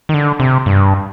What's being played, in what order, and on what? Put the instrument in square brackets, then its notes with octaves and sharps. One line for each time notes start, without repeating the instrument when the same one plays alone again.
[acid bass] D#3
D3
C3
G2